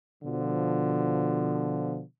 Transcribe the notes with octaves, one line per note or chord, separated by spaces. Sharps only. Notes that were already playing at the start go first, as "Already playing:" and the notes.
B2 D3 F3